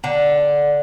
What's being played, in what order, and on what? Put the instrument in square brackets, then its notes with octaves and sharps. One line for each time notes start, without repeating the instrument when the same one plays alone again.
[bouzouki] D3